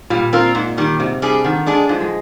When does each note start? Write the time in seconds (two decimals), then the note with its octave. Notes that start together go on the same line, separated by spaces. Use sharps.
0.10 A#2 G3
0.33 C4 F4 A#4
0.55 G#2
0.77 D#3 G3
1.00 G#2 C3
1.22 G3 D4 G#4
1.44 D3 D#3
1.67 G#3 D4 G#4
1.89 G#2 F3
2.01 G#3